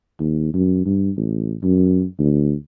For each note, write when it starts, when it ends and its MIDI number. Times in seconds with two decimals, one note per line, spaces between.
0.19 0.49 39
0.54 0.84 42
0.85 1.11 43
1.17 1.55 33
1.62 2.04 42
2.19 2.55 38